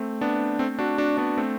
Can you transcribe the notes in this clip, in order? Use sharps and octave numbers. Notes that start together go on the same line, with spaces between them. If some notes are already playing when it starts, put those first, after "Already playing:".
Already playing: A3 C4
B3 D4
A3 C4
D4 F#4
D4 F#4
B3 D4
A3 C4